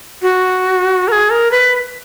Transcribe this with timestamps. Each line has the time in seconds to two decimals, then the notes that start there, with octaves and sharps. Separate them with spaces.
0.22 F#4
1.08 A#4
1.12 G#4
1.30 A#4
1.51 B4